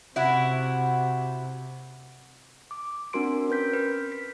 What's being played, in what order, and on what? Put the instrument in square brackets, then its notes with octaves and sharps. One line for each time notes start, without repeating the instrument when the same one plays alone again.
[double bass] C3 [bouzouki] E4 F#4
[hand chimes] D6
C4 D4 F#4 A#4 C6 D7
C#4 A#4 B4 G6 B6
B4
B6